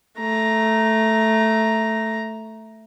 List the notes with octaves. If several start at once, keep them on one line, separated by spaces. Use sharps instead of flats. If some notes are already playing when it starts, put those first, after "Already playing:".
A3 A#5